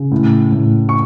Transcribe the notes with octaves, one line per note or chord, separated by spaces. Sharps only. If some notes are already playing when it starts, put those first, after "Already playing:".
Already playing: C#3
A2
A2
C#6